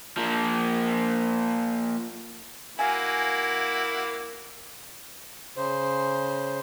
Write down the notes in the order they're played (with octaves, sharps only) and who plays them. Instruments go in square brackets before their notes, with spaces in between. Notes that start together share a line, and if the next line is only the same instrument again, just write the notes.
[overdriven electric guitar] F3 A#3
[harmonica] A#3 E4 F#4 [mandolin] F5 G#5
[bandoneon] C#3 C5